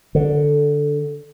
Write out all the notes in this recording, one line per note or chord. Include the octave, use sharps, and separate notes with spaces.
D3